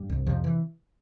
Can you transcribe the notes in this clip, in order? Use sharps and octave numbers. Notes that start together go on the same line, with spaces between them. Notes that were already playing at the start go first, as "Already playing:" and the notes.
Already playing: G2 G3
C2
F2 C3 F3
E3